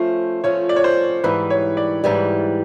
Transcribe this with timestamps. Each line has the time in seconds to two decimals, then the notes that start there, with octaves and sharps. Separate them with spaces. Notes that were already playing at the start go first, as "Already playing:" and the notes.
Already playing: F3 A3 C#4 F4 C5
0.44 F3 A3 C#4 F4 C#5
0.69 D5
0.76 C#5
0.84 C5
1.24 G#2 E3 G3 B4
1.50 C#5
1.77 D5
2.04 G#2 E3 G3